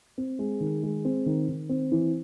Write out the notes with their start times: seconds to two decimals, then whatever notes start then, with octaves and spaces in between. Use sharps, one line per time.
0.18 C4
0.39 G#3
0.61 D#3
0.83 G#3
1.05 C4
1.26 D#3
1.48 D#3
1.69 C4
1.92 E3